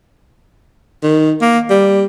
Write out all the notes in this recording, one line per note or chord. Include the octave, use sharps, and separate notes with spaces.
D#3
A#3
G3